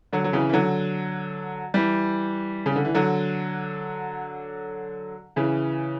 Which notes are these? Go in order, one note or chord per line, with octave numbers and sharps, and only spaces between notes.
D3 F#3
F#3
C#3 E3
E3
D3 F#3
E3 G3
C#3
D3
E3
D3 F#3
C#3 E3